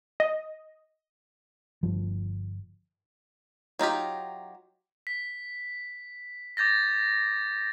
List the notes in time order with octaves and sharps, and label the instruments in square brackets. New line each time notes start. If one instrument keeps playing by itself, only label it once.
[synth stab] D#5
[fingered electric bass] G1 F3
[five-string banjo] F#3 D#4 F4 G4
[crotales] B6
D6 G6 A6 A#6